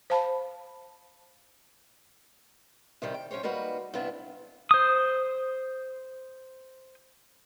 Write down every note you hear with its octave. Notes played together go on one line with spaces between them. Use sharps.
C5 F5 A5 B5
C3 D#3 G3 G4
G5
F#3 C#4 G4 C5 C#5
G3 A#3 D#4 F#4 B4
G2 C3 B3 D4 E4
C5 D#6